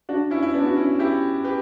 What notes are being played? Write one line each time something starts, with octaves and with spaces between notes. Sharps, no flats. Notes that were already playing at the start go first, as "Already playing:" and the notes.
D4 F#4
C#4 E4
E4
B3 D4
F#4
C#4 E4
E4 G4
G4 B4